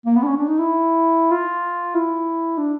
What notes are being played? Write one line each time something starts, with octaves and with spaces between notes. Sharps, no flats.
A#3
B3
D4
C#4
D4
D#4
E4
F4
E4
D4